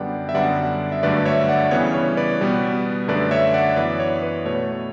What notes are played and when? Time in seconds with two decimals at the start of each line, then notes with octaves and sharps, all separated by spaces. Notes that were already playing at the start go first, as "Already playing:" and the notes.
Already playing: F#2 D3 G3 B3 D5 F#5 G5
0.29 E5
0.34 F#2 D3 G3 B3 D5 F#5
0.92 E5
1.03 G2 D3 F#3 A3 B4 D5
1.25 C#5 E5
1.49 D5 F#5
1.71 C#3 E3 G3 B3 C#5
1.94 C#5
2.17 B4 D5
2.41 B2 G3 B3
3.08 F#2 D3 A3 B4 D5
3.31 C#5 E5
3.54 D5 F#5
3.76 F#2 E3 B3 B4 D5
4.00 C#5
4.23 B4
4.45 B2 A3 C#5